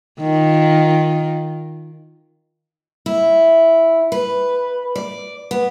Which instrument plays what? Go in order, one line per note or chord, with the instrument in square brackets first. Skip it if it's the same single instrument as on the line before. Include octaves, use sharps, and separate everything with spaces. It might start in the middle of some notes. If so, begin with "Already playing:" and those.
[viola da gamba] D#3 F4
[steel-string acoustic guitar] E4
B4
D5
B3